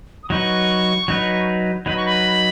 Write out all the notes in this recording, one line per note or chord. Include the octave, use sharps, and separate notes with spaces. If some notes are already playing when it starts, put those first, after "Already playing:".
D#6
F#3 D#4 B4 C#6
F#3 D#4 B4
F#3 D#4 B4 B5
C#6
B5